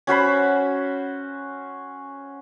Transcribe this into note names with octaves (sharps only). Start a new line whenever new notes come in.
C#4 F#4 C5 B5